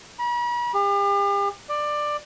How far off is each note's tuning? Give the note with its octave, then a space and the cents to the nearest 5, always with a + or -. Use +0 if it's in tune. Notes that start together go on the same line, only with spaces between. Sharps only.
B5 -45
G4 +40
D5 +15